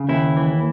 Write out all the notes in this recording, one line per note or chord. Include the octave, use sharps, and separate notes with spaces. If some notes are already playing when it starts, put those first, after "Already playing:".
Already playing: C#3
D#2 E4
E3